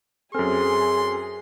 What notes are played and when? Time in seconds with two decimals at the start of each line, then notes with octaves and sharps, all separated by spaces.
0.34 F#2 C4 G#4 A4 G#5 C6 F6